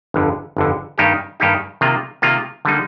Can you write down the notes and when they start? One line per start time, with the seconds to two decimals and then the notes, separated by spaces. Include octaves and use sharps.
0.14 G1 F2 D3
0.57 G1 F2 D3
0.98 G2 D#3 A#3 D#4 G4
1.40 G2 D#3 A#3 D#4 G4
1.81 C3 D#3 A#3 F4
2.22 C3 D#3 A#3 F4
2.65 D3 G3 A#3 D#4